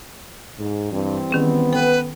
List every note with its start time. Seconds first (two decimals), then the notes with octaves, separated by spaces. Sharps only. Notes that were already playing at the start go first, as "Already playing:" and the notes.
0.59 G#2
0.92 G2 E3 G3 C4
1.31 D#3 B3 C#4 G#4
1.73 A4 B4 F#5 G5